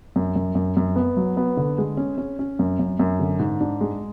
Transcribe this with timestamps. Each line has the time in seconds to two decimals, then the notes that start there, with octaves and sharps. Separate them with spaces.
0.16 F#2
0.36 F#2
0.55 F#2
0.77 F#2
0.96 B3
1.17 F#3
1.37 B3
1.57 D3
1.78 G#3
1.97 C#4
2.18 C#4
2.39 C#4
2.59 F#2
2.79 F#2
3.00 F#2
3.20 D3
3.39 G#2
3.60 D4
3.81 G#3